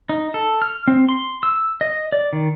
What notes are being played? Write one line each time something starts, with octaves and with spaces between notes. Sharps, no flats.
D#4
A4
F6
C4
C6
E6
D#5
D5
D#3